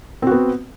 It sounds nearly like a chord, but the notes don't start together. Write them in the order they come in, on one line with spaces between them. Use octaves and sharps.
C4 F#4 B3